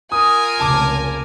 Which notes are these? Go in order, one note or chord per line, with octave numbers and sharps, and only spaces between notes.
F4 A#4 G#5 D#6
F1 C#2 C#3 A5 D6